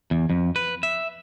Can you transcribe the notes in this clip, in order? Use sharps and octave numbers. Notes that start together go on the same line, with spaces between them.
E2
F2
B4
E5